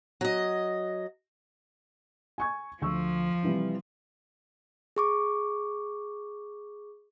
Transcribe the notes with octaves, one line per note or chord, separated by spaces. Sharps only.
F#3 D#5
G#5 C#6 G#6
D2 F3 C#6 E6
C3 E3 G3
G#4 C#6 D6